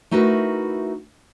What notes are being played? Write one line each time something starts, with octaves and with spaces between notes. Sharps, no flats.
A3 D#4 E4 F#4 A#4 B4